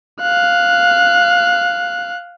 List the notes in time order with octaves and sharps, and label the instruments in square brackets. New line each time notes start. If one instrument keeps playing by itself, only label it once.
[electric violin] F5 F#6